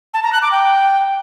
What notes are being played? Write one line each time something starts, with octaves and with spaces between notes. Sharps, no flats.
A5
A#5
F#6
D6
G5